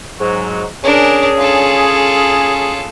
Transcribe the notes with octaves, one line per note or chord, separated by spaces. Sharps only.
G#2 F#3
C#4 D4 G#4 A#4
F4 A4